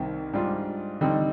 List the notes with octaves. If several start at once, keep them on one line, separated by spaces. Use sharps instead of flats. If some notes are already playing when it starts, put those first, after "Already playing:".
Already playing: C2 C3 D#3
G#2 G3 D4 F4
D3 G3 C4 D#4